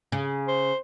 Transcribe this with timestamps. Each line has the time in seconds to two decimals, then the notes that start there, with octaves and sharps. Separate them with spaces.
0.12 C#3
0.48 C5